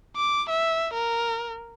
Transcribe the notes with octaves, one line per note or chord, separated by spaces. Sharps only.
D6
E5
A#4